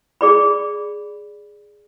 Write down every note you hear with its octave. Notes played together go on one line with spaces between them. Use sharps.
G#4 D5 B5